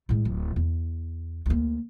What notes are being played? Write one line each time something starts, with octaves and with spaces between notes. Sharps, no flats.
A2 G#3
D1
E2
D2 A#3